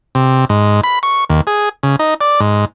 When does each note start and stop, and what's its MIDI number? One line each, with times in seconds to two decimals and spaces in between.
0.15 0.45 48
0.49 0.81 44
0.84 0.99 83
1.03 1.24 85
1.29 1.41 39
1.47 1.69 68
1.83 1.96 49
1.99 2.14 63
2.21 2.40 74
2.40 2.65 44